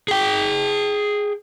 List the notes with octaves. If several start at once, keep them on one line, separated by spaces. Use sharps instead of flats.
G#4 G5